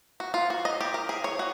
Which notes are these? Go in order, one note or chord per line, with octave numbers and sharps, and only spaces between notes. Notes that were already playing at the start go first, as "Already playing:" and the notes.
F#4
F4
F#4
D#5
G4
A#4
G#4
C#5
F#4